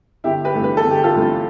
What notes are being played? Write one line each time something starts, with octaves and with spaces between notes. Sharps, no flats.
G1 E4 G4
G4 B4
G2 E3 A3
B4
A4
G1
G4
F4 A4
G2 E3 A3